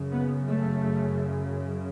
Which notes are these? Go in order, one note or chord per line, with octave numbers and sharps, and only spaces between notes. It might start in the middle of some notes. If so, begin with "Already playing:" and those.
Already playing: F#2 C#3
B3
A3